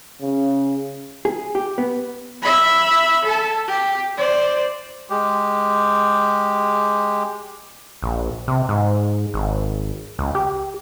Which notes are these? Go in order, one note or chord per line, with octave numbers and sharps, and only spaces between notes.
C#3
G#4
G4
B3
E5 B5
A4 A5
G4
C5 D5
G#3 G4
A#1
C3
G#2
G#1
C#2
G4